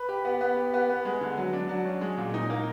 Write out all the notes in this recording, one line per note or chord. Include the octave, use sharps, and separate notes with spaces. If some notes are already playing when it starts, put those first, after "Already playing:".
Already playing: B4
G4
B3
B3
G4
B3
B3
G#3
D3
F#3
D4
F#3
C#4
G#3
A#2
D#4
A#3